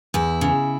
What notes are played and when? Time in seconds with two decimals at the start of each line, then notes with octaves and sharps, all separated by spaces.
0.14 E2 E4
0.41 C#3